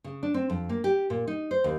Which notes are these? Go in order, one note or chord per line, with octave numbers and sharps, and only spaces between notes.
C#3
D4
C4
F2
A#3
G4
A#2
D#4
C5
D#2